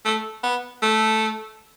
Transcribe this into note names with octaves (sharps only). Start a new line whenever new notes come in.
A3
B3
A3